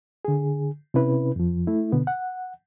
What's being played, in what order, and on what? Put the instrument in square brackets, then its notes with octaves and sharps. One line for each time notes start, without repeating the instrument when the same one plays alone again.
[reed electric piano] D3 G#4
C3 C#4 E4 B4
F2 F3
A3 E4
B2 D3 B3
F#5